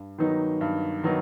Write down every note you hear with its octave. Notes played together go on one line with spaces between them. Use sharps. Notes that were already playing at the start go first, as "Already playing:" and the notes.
Already playing: G2
D#3 F#3 B3 D#4
G2
D#3 F#3 B3 D#4